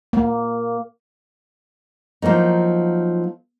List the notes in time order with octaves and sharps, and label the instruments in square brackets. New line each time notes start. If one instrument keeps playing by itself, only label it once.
[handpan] A#3
[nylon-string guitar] F3 F#3 A#3 D#4